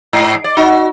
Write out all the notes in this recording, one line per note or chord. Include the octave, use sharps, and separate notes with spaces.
G#2
D5
D#4 F#4